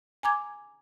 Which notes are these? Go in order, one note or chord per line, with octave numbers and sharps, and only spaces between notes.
G#5 A#5 D6 G#6